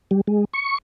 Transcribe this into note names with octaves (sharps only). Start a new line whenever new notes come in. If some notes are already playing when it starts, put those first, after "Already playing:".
G3
G#3
C#6